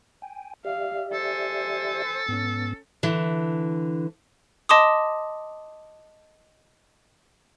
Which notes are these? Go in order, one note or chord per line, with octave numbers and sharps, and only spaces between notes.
G5 G#5
G4 D5 E5 F5
A4 C5 G#5
G#2 B3 C#4 A6
D3 E3
D#5 A5 C6 D6 D#6